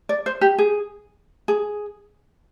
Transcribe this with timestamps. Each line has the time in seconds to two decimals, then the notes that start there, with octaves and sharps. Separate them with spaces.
0.09 D5
0.26 C5
0.41 G4
0.58 G#4
1.48 G#4